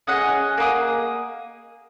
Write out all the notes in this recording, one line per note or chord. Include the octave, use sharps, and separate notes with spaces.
C#4 G#4 D#5 F#5
A#3 F4 G#4